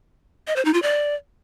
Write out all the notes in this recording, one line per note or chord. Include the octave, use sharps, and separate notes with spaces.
D#5
C5
D#4
F4
D5